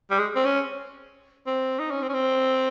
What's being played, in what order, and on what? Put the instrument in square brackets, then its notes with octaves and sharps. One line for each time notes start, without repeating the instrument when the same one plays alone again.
[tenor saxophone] G3
G#3
C4
C#4
C4
D#4
C#4
C4
C#4
C4